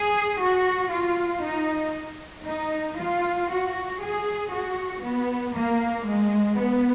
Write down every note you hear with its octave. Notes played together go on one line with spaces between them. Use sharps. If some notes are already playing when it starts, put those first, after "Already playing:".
Already playing: G#4
F#4
F4
D#4
D#4
F4
F#4
G#4
F#4
B3
A#3
G#3
B3